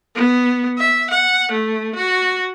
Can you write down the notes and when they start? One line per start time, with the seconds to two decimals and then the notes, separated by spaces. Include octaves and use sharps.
0.15 B3
0.78 E5
1.10 F#5
1.52 A3
1.95 F#4